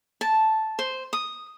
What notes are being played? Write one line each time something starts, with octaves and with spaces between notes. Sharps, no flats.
A5
C5
D#6